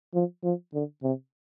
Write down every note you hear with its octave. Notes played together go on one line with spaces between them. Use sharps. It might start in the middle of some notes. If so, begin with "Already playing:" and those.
F3
F3
D3
C3